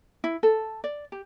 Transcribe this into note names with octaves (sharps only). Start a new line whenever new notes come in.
E4
A4
D5
G4